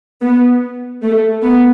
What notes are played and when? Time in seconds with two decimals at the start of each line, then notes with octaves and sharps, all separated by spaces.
0.22 B3
1.03 A3
1.43 B3